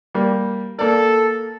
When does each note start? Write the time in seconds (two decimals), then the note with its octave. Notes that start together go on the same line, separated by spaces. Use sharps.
0.14 G3 A#3
0.79 A#3 A4 D5